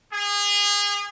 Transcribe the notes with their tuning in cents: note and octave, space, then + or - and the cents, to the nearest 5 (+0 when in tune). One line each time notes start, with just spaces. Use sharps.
G#4 -30